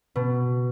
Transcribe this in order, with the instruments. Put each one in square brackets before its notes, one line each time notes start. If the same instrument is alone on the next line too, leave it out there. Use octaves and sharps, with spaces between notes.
[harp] B2